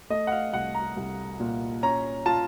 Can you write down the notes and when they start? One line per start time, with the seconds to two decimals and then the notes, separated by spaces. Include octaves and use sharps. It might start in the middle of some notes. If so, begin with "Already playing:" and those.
0.10 A3 D#5
0.27 F#5
0.32 F5
0.53 C2 F#5
0.75 A#5
0.96 C2
1.40 A#2
1.83 C#4 A#5
2.26 F4 A5